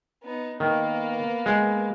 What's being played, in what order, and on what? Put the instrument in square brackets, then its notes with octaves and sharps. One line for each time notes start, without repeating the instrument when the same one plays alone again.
[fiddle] B3 D#4
[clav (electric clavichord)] D#3 [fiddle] A#3 B3
[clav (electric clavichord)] G#3